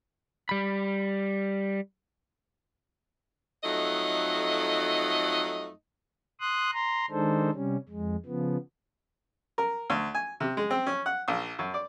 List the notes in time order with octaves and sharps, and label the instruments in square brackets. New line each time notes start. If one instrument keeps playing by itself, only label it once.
[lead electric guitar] G3 B5
[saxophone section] F2 F#3 A3 D#4 D#5
[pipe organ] C6 D#6 F#6
A#5 C6
D#3 G#3 D4 D#4 A4 C5
C3 G3 C#4
F2 G#3
C#3 F3 B3
[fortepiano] A#4
D2
G#5
C3
G#3
C4
C#4
F#5
A#1
F#2
D5